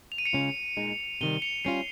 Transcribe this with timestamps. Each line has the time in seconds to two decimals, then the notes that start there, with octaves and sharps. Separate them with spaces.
0.12 F7
0.18 D#7
0.25 C#7 F7
0.33 C#3 G#3 C#4 F4
0.77 A#2 G#3 D#4
1.21 C3 D#3 G3 D#7 G7
1.42 C#7 F7
1.64 G3 C#4 F4 C7 D#7